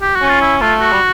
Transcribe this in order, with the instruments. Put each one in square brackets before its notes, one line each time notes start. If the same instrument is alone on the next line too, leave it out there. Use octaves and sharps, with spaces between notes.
[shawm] G4
F#4
[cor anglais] C#4
[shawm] F4
E4
[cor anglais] A3 [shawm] F4
[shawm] F#4
[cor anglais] G3